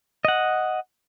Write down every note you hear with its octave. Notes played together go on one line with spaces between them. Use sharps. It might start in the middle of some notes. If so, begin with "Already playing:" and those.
D#5 F#5